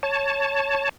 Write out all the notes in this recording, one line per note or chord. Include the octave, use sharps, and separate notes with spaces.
C#5 A5